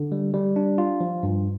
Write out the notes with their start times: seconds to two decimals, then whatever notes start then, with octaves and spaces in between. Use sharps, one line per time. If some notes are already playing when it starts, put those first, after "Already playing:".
Already playing: D3
0.12 G3
0.34 G3
0.56 D4
0.78 F4
1.00 F3
1.23 G2